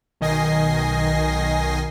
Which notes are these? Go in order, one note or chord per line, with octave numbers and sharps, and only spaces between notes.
B1 D#3 D#5 G#5 A#6 C7